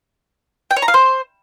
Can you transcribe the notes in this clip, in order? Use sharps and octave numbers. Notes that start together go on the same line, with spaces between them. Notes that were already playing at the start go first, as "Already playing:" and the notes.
G5
C#5
A#5
F5
C5